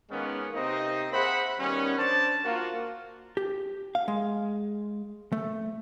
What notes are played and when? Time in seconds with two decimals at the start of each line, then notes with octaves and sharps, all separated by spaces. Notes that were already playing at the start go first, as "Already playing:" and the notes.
0.10 D#3 G#3 A#3 B3 C#4
0.54 C3 A#3 C4 D#4 C5 D#5
1.13 G#4 C5 E5 F#5 B5
1.59 D#3 G3 B3 C#4
1.98 D4 C5 D5 A5
2.44 A#3 F4 F#4
3.37 G4
3.95 F5
4.08 G#3
5.32 A3